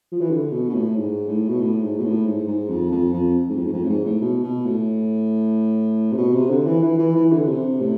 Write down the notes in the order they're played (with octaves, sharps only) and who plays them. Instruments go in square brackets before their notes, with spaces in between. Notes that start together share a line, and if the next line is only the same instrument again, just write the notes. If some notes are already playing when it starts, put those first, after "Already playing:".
[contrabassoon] F3
E3
D3
B2
B2
A2
G#2
A2
B2
A2
G#2
B2
A2
G#2
G#2
F2
F2
F2
G#2
F2
G#2
F2
A2
G#2
A2
B2
B2
A2
C3
B2
C3
D3
E3
E3
E3
E3
D3
C3
A2